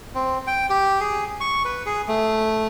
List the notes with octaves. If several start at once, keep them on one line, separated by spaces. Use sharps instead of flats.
C4
G5
G4
G#4
C#6
B4
G#4
A3